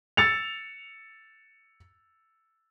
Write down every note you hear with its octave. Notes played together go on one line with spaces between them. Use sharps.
E6 A6 C#7 F7